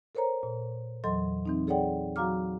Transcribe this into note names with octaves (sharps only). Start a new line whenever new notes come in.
A4 A#4 C5 C#5 A#5
A#2
E2 E3 F#3 A4 D#5 C6
E3 C4 D#4
G#4 A4 C#5 D5 F#5 G5
F#3 F#4 F5 A#5 D6 F6